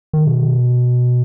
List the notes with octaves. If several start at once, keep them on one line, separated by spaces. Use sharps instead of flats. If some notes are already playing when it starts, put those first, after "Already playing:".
D#3
B2